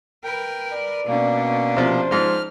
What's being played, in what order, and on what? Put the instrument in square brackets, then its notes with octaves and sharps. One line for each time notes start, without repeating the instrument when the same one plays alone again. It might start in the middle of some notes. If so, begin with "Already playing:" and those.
[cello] A#4 B4 [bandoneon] G5
[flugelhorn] D5
[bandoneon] B2 A#3 [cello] C#4 D4
[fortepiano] C3 F3 [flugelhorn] C5
[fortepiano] G#2 F3 [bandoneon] F6